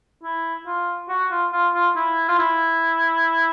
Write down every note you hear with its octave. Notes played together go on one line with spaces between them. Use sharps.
E4
F4
F#4
F4
F4
F4
E4
F4
E4